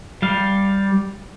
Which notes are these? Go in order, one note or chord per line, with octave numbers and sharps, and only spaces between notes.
G3 F5